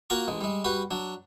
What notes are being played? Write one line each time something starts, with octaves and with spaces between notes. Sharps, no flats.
A#3 F4 F#4 A#5 C#6
A1 G#3
G3 G#3
G3 F#4 G4 B4
F#3 D4